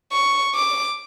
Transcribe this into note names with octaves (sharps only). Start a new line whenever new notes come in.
C#6
D6